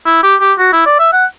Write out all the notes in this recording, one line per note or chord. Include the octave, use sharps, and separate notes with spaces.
E4
G4
G4
F#4
E4
D5
E5
F#5